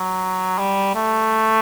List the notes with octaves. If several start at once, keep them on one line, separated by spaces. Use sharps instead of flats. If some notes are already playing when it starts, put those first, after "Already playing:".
Already playing: F#3
G3
A3